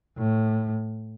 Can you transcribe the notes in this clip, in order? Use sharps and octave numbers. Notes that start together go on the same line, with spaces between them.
A2